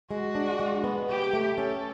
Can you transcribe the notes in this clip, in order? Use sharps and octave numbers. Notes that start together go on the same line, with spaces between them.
G#3 F#4
D4
G#3
B3
C3 G4
A3
C#4 A4